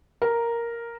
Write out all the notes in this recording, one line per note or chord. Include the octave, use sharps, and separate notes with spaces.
A#4